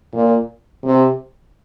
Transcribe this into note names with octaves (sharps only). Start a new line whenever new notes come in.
A#2
C3